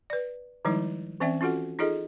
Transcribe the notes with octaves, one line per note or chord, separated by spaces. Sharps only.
B4 D5
D#3 F3 G3 G#3 D#4 E4
E3 C4 C#4 D5 E5 G5
C#4 F4 F#4 A4 F#5
D#4 F4 G#4 A4 D#5